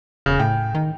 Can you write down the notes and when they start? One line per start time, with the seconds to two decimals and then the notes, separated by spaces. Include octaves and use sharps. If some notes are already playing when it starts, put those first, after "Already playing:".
0.26 E1 C#3
0.40 A2 G5
0.75 D#3